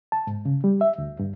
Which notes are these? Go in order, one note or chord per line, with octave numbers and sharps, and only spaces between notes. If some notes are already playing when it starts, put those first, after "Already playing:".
A5
G#2
C#3
G3
E5
D2
G2